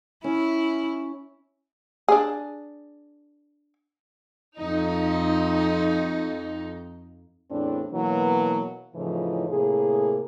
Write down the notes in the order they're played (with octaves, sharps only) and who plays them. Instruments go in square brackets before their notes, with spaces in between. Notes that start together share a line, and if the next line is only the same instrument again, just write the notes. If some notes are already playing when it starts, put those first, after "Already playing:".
[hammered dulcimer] C#4 [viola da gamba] E4
[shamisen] D4 G#4
[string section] F2 D#4
[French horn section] E2 A2 C4 D4
B2 E3 F#3 A#3 B3
A2 C#3 E3 F3 D#4
A2 C3 A#3 G#4